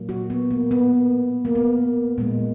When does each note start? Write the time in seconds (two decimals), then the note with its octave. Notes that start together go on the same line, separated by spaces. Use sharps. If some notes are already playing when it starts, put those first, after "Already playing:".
Already playing: A#2 F#3 A#3
0.09 F#4
0.30 B3
0.51 A#3
0.71 B3
1.45 A#3
1.55 B3
2.18 A#2 G#3